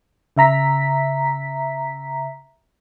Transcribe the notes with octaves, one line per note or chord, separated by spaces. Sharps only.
C#3 E5 A#5 B6